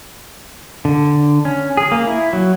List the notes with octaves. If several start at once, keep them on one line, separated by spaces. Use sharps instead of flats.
D3
C#4
G#4
A#3
E4
F#3